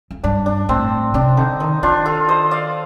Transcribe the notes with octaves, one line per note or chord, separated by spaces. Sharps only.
F2
G2 D4
D4
A2 C4
C3 D4
D3 D#4
D#3 D#4
D#3 D4 F4
F4 A4
C5 D#5
D5 F5